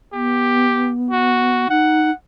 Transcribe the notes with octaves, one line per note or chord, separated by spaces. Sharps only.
B3 G4
F#4
D#4 F#5